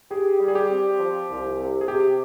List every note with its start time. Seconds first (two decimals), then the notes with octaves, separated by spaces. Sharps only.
0.11 G4 G#4
0.40 G3
0.48 G#4
0.55 G4
0.70 C4
0.99 F3
1.30 C2
1.59 C3
1.81 G#4
1.88 C3 G4